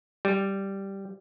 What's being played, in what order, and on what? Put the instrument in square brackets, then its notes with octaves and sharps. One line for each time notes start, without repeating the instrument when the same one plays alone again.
[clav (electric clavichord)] G3